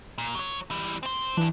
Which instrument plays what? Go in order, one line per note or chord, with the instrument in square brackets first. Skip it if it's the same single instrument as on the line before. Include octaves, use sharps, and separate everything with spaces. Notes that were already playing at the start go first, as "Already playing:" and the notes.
[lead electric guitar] A#2
F#3 C#5
E3 G3
C4 C5
[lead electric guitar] G2 D4 [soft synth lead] E3